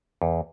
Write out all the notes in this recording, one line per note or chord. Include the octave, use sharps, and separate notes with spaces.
E2